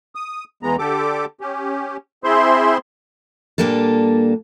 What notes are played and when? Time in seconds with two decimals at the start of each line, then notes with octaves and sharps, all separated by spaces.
0.15 D#6
0.63 E2 E3 G#3 B3 A#5
0.79 D3 G4 A4 D6
1.41 C#4 G4
2.24 C4 E4 G#4 C5 E5 C6
3.58 A#2 G3 A#3 D4 A4